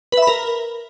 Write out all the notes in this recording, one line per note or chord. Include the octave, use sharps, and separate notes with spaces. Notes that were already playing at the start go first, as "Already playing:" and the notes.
B4
E5
B5
A#4